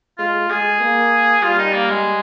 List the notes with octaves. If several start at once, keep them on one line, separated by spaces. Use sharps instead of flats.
G#3 F4
G#3 G#4
A#3
G3 F4
D#4
A#3
G#3